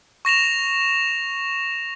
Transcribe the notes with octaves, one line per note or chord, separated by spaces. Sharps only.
C#6 A#6 E7 F7